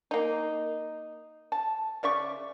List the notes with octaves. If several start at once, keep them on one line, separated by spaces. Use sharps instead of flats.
A#3 D#4
A5
C#3 D5 E5 C#6